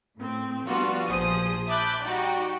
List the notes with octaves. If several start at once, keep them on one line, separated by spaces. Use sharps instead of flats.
A2 C4
F3 G3 B3 D4 F4 F#4
A#1 F3 G#4 C5 D#6
E5 A5 B5 D6 F#6 G6
G3 D#4 F#4 D5 G5